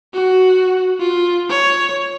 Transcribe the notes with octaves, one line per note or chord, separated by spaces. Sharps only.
F#4
F4
C#5